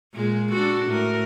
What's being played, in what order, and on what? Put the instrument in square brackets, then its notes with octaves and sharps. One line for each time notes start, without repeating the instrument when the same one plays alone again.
[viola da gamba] A#2 G#3 G#4
D4 F#4 A4
A2 A#4